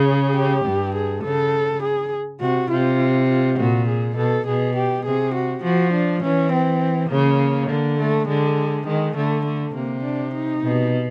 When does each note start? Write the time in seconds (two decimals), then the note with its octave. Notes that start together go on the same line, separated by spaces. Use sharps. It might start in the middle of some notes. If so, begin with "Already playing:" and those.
Already playing: C#3 G#4
0.36 G4
0.65 G2
0.94 G#4
1.23 C#3 A4
1.82 G#4
2.40 C3 F#4
2.70 C3 F4
3.29 F4
3.59 A#2 F#4
3.88 G#4
4.17 B2 A4
4.46 B2 G#4
4.76 G4
5.05 C3 G#4
5.35 F#4
5.63 F3 F#4
5.93 D4
6.22 E3 C#4
6.52 C4
7.10 C#3 A#3
7.70 D3
7.99 A3
8.27 D3 G#3
8.87 D#3 G#3
9.16 D3 A3
9.45 A3
9.74 C3 A#3
10.04 D4
10.34 D#4
10.63 B2